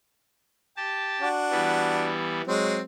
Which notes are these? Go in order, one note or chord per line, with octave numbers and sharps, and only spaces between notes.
G4 A5
D4 F#4
E3 G3 B3
F#3 G#3 C4